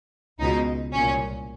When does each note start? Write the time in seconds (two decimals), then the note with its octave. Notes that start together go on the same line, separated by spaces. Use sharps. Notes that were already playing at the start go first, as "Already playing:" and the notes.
0.39 C#2 B2 D#4
0.93 C2 A#2 C#4